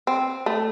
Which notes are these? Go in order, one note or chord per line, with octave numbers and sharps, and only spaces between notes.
C4
A3